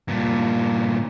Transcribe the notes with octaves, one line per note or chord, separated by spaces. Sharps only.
G2 A#2